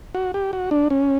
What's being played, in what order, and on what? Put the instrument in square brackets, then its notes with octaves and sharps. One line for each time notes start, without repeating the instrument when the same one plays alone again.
[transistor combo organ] F#4
G4
F#4
D4
C#4